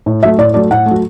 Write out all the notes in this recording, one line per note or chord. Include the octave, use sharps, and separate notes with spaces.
A2
F#3 A3 E5
A2 D5
F#3 A3 D5
A2 F#5
A3
F#3